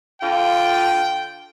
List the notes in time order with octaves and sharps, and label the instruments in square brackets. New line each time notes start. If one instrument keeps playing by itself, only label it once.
[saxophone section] D3 F4 [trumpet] G5